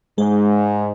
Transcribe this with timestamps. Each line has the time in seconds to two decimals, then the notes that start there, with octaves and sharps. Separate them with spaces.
0.18 G#2 G#3 G#4